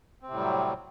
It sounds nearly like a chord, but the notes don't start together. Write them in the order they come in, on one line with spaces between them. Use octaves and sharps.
C4 C3 A2 G3 F#3